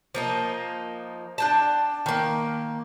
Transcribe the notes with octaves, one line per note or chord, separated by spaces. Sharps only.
F3 A#3 D#4
D4 G5 A5
D#3 A#3